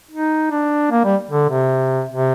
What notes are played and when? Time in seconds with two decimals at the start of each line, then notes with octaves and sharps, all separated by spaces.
0.11 D#4
0.51 D4
0.91 A#3
1.04 G3
1.31 D3
1.49 C3
2.09 C3